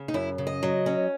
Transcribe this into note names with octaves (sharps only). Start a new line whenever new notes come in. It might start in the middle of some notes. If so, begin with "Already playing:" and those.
Already playing: C#3
D#4
F#2 E4
C#3
D#5
F#3
C#4